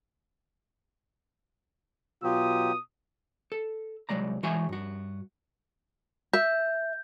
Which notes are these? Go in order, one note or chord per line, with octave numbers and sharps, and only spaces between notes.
B2 F#3 F4 G4 D#6
A4
C2 F#3 G#3 D5 A#5
E3 G#3 F#4 C#5 E5 G#5
G2 F#4
E5 G6